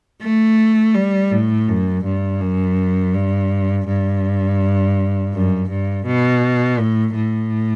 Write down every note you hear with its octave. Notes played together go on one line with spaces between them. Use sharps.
A3
G3
A2
F#2
G2
F#2
G2
G2
F#2
G2
B2
A2
A2